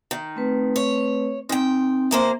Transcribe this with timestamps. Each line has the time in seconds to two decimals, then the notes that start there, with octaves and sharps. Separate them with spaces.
0.11 D#3
0.36 A3 C4 B4
0.76 C#5
1.49 A#2 C4 D#4 G5
2.11 D2 A#3 C5 E5